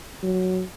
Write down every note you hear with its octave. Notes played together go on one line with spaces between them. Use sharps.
F#3